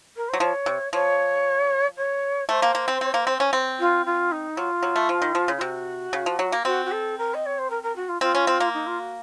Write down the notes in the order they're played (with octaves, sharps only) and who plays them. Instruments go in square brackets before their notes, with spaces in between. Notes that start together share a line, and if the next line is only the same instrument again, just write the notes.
[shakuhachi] A#4
C5
[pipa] F#3
[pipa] F3 [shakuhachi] C#5
[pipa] C3
[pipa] F3 [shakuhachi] C#5
[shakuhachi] C#5
[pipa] A3 [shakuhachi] C5
[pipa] A#3
A#3
C4
C4
A#3
C4
C#4
C4
[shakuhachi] F4
F4
D#4
[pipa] F#3 [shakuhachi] F4
[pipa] F#3
A3
F3
D#3
F3
C#3
[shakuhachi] F4
[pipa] C3 [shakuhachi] F#4
[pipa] C#3
F3
F#3
A#3
[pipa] C4 [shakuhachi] F#4
[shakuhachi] F#4
A4
A#4
D#5
C#5
C5
A#4
A#4
F#4
F4
[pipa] C4 [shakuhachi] F4
[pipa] C#4
C4
A#3
[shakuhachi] D#4
F4
F#4